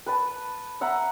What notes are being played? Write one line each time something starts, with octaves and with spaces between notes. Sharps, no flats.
B4 A5
E5 F#5 A#5